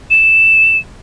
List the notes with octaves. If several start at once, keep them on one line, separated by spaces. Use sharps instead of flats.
E7